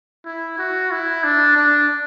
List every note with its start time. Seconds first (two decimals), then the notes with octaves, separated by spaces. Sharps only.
0.25 E4
0.58 F#4
0.91 E4
1.24 D4
1.56 D4